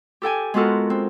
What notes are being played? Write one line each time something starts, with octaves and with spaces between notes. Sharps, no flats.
G4 A4 G5 G#5
G#3 B3 F4 F#4 A4 A#4
C4